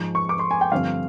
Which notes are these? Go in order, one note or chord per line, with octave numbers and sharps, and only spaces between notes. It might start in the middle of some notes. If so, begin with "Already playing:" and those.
Already playing: G#2 F3 G#3
C#6
D6
C6
G#5
G5
G2 D3 F3 A3 C4 F5